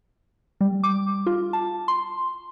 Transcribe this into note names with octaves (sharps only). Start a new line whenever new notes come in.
G3
D6
F4
A5
C6